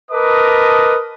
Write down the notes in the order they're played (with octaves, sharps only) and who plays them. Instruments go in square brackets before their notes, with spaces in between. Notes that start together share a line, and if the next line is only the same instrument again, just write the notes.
[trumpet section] A#4 B4 D#5 A5 D6 D#6